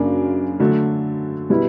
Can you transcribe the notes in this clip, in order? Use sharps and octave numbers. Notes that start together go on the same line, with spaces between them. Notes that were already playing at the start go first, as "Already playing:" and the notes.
Already playing: F#2 C#3 A#3 D4
D3 F#3 A3
B2 G3 B3 E4